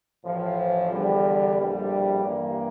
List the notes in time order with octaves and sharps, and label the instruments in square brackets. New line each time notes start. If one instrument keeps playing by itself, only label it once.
[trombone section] A1 A2 F3
E2 D3 G3
A#1 A2 G3 D4
G2 E3 A#3